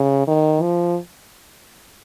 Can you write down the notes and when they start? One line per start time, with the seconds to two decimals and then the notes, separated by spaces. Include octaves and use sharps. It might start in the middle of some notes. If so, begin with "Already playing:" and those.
Already playing: C#3
0.28 D#3
0.62 F3